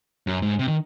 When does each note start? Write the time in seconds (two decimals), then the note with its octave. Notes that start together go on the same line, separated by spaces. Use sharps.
0.27 F#2
0.42 G#2
0.59 C3
0.68 D#3